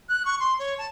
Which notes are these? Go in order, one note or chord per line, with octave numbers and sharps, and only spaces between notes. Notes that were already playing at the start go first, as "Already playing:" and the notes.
F#6
C#6
C6
C#5
A5